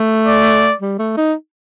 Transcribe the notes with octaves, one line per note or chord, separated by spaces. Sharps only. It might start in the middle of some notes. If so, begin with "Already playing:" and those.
Already playing: A3
D5
G3
A3
D#4